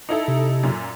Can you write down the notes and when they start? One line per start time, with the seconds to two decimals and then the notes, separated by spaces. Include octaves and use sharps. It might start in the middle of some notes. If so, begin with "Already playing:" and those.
0.09 D#4 E4 A4
0.28 C3
0.63 F#2 A#2